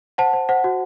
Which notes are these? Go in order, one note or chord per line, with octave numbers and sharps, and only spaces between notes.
C5 F#5 A5
C5
C5 F#5
F#4